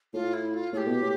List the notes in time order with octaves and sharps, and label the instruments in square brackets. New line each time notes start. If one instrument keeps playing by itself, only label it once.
[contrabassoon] A2 [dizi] F4
[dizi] E4
F4
[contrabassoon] A2 [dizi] A4
[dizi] G4
[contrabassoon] B2
A2